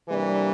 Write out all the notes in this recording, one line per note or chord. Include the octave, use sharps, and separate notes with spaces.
C3 E3 G3 A#3 D4